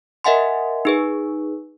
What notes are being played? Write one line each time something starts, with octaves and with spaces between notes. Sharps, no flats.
A#4 D#5 E5 F#5 G#5 C6
D#4 G#4 B4